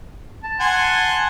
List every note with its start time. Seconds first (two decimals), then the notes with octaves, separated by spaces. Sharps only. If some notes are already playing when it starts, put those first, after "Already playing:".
0.44 A5
0.60 F#5 G#5 C6